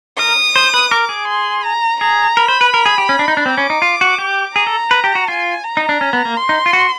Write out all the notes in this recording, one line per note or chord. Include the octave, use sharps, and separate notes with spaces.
A#4 D#6
C5
B4
A#4 D6
G#4
C6
A#5
G#4 A#5
A#4 B5
C5
B4
A#4
G#4
G4
C#4
D4
D#4
D4
C4 D6
C#4
D#4
F4
F#4
G4
G#4 A#5
A4
B4
G4
F#4
F4 G#5
A#5
D#4
D4
C#4
B3
A#3
C6
D#4
F4
F#4